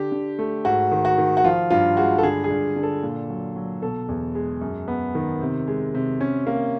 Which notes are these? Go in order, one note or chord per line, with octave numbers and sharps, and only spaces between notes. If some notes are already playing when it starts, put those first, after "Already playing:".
Already playing: D3 G4
D3
A3
G#2 F#4
D#3
F#4
D#3
F#4
F3 F4
G2 F4
G#3 F#4
A4
D3 G#4
G#4
G2
D3
A4
A#2
F#3
F#3
B2 A4
E2
G#3
F#2
B3
D#3
C3
G#3
C3
C#4
A#3